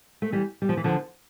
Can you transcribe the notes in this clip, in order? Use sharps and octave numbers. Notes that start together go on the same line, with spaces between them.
A3
E3 G3
G3
F3
E3
D3 F3